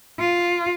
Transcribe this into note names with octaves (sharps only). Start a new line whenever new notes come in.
F4